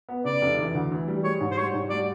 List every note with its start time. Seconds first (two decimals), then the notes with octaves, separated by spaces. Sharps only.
0.09 B3
0.25 C#3 D5
0.41 F1
0.58 E3
0.74 D2
0.91 E3
1.08 G3
1.24 G#3 C#5
1.41 G#2
1.51 C5
1.57 G3 C#5
1.74 G#2
1.90 G3 D5